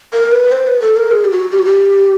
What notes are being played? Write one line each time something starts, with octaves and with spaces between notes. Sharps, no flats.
A#4
B4
C5
B4
A4
A#4
G#4
G4
F#4
G4
F#4
G4